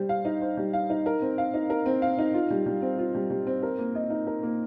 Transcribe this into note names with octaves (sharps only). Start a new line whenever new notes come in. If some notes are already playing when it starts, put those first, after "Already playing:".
Already playing: G3 C5
F5
D#4
C5
G3
F5
D#4
A#4
C4
F5
D#4
A#4
C4
F5
D#4
F4
G3
G3
C4
F4
G3
G3
C4
A#4
A#3
D#5
D#4
A#4
A#3